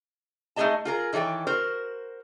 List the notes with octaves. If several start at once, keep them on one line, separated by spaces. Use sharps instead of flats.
A3 D#4 E4 G#4 D#5 A5
F4 G#4 A#4
D#3 E3 A4 C#5 G5
F#4 A#4 C5